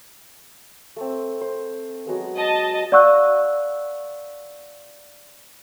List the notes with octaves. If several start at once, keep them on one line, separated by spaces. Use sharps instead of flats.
A3 C4
C5
F#3 G#3 B3
D#5 A5
D5 F5 F#5 C#6 E6 F#6